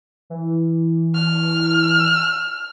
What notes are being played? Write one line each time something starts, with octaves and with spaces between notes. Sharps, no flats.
E3
F6